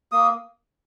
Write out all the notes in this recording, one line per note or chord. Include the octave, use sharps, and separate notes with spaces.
A#3 D#6